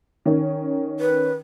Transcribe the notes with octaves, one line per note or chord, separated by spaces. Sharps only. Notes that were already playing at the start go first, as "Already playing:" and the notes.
D#3 C#4
B4